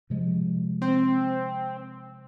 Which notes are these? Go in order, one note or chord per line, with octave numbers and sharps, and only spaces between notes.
C3 F3 G#3
C4